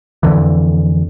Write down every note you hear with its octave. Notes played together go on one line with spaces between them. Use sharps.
F2 D3 E3